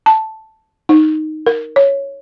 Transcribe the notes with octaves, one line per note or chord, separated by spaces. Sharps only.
A5
D#4
A#4
C#5